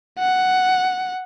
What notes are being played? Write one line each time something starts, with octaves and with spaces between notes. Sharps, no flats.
F#5